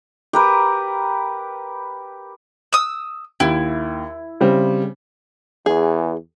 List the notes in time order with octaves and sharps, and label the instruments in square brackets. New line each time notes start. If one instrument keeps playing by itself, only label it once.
[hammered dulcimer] G4 A#4 B4
[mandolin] D#6 E6
[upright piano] D#2 [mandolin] E4
[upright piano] C#3 G3 C4
[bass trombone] E2 [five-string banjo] G#4